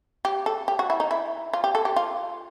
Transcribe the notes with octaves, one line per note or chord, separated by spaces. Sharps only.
G4
A4
G4
F#4
E4
D#4
E4
F4
G4
A4
G4
F4